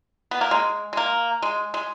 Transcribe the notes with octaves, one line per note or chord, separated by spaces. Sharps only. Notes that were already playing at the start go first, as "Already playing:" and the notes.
B3
A#3
G#3
G#3
A#3
G#3
G#3